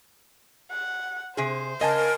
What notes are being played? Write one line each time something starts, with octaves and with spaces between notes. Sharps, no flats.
F#5
C3 G#4 C5
C#3 A#4 D#5 G#5 A5